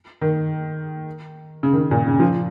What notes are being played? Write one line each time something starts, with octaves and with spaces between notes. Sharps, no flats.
D#3
C#3
D#3
C#3
A#2
C#3
F3